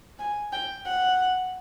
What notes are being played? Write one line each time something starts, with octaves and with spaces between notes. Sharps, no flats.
G#5
G5
F#5